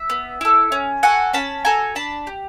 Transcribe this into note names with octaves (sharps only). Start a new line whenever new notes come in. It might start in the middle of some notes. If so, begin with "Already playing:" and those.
Already playing: E5
B3
E4 A4
C#4
F#4 A4 F#5 G#5
C#4 A5 B5
F#4 A4 G#5 A#5
D4 A5 B5
G4